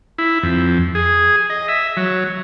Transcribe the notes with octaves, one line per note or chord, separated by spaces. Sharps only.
E4
F2
G#4
D#5
E5
F#3